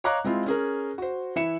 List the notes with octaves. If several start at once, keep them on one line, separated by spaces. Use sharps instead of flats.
C#5 D#5 F5 A#5 D6 F#6
G#3 C4 E4 F4
C#4 G#4 A#4
F#4 C5
E3 E4 E5 C#7 E7